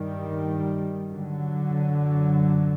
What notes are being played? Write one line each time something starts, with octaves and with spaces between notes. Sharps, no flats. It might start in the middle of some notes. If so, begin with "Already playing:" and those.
Already playing: G2 D#3 G3
D3 F#3
F#2